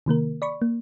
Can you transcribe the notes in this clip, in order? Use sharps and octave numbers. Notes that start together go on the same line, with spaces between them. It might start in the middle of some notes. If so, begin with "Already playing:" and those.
C3 D#3 A#3 A#4
D5 B5 C#6
A#3